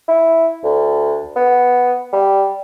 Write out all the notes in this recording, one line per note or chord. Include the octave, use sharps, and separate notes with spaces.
E4
D2
B3
G3